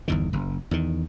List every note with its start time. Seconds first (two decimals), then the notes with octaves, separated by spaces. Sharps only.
0.08 G1 E2 D#3
0.33 F#1
0.71 E2 D#3